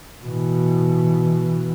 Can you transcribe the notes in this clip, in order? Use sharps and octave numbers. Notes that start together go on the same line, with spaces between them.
B2 E3